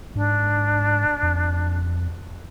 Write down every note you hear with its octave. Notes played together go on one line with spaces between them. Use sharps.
G#2 D4
F2